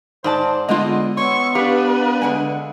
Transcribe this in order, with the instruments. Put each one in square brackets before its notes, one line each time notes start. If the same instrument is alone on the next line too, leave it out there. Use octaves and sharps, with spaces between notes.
[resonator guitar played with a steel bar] G#2 D5 A5 [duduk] C5
[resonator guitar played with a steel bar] D3 F4 [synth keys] G#3 D#5 [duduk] B3
[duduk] B3 [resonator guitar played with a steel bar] C#5 [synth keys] C6 E6 [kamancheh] C#6
[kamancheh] D4 B4 [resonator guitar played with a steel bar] G4 [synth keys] F5
[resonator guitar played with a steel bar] D3 F#5 G#5 [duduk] G#3